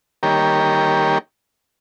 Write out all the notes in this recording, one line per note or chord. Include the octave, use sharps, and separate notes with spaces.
D#3 G3 A#3 G4 A#4 C#5